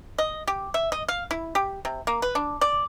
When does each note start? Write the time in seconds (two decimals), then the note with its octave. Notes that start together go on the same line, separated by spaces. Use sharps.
0.18 D#5
0.47 G4
0.74 E5
0.92 D#5
1.08 F5
1.31 E4
1.55 G4
1.85 C3
2.07 A#3
2.22 B4
2.35 D4
2.61 D5